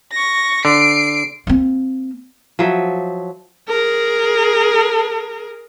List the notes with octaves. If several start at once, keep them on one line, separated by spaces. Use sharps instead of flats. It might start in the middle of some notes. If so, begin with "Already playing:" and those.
C#6 A#6
D3 C7 D7
A#3 C4
F3 F#3 E5
G#4 A#4